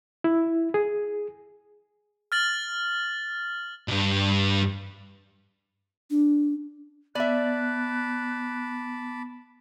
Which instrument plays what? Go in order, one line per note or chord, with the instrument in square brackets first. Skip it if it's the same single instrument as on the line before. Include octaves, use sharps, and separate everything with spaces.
[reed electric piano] E4
G#4
[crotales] F6 A6 F#7
[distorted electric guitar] B1 G2
[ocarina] D4
[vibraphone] B3 [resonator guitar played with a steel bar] D5 E5 [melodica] A5 B5 D6 [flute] F#6